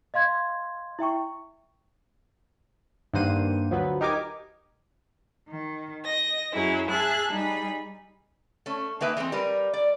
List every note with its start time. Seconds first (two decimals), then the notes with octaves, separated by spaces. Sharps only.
0.14 D#5 F5 C6 G#6
0.99 E4 E5 G5 C#6
3.13 G2 D#3 A#3 C5 F#5 D#7
3.70 D2 F3 F#3 B3 B4
4.01 D#4 G4 A#4 G#5 D6
5.50 D#3
6.05 D#5 A#6
6.53 F#2 F#3 C#4 E4 G#4
6.90 G#4 E5 A5 F#6
7.31 G3 D#4 G#4 B5
8.66 A3 C#4
9.01 D#3 A#3 B4 E5 G#5
9.17 E3 G#3 A3 C4
9.32 G3 A#4 B4
9.73 D5